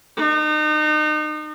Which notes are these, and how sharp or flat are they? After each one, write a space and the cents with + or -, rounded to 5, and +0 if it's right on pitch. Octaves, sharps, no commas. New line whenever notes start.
D#4 -35